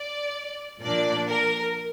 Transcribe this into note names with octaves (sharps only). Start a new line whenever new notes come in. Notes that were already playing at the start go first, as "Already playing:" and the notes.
Already playing: D5
A#2 F3 A#3 D4 D5
A#4